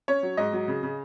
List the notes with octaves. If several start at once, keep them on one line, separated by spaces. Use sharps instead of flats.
C#4 C#5
F#3
G#2 D#5
F#3
C#3
C#3